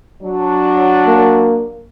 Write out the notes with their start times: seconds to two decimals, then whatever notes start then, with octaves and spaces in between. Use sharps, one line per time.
0.22 F#3 D4
1.06 A#3